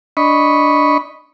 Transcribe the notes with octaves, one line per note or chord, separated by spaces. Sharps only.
D4 D#5 B5 C#6